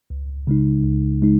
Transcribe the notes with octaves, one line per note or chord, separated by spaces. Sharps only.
C#2
C#3 G#3 D#4
C#2
C#3 G#3 D#4